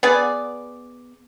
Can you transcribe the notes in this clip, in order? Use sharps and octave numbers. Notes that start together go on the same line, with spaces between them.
B3 G#4 D5